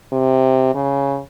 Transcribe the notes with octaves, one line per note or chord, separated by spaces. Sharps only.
C3
C#3